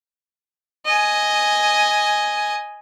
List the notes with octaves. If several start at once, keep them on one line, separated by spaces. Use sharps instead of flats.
D#5 G#5